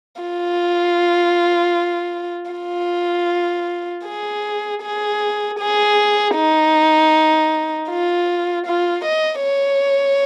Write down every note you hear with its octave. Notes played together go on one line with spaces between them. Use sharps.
F4
F4
G#4
G#4
G#4
D#4
F4
F4
D#5
C#5